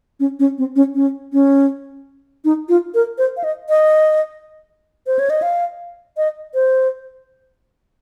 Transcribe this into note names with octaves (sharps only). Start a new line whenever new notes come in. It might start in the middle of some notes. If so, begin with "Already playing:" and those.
C#4
C#4
C4
C#4
C#4
C#4
D#4
F4
A#4
C5
F5
D#5
D#5
C5
C#5
D#5
F5
D#5
C5